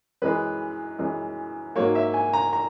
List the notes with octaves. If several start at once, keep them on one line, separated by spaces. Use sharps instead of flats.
F#2 E3 G#3 B4
F#2 E3 G#3
G#2 F#3 A#3 C#5
E5
G#5
A#5
A#5